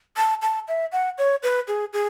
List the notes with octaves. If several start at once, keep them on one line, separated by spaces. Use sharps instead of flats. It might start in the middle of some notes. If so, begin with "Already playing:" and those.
A5
A5
E5
F#5
C#5
B4
G#4
G#4